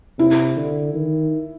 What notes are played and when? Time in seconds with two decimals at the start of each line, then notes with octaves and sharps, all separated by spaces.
0.19 C3 E4
0.56 D3
0.94 D#3